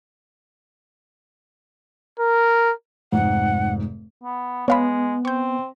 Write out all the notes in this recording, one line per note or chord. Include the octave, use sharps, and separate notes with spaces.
A#4
F1 G#2 F#5
B3
G#3 B3 C#5 F5 B5
C4 C#6 G6